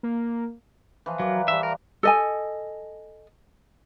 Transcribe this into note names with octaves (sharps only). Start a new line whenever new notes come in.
A#3
E3 F3
F#3 A#4 B4 D5
E3 F3 G3 E5
A#4
A4 D#5 G#5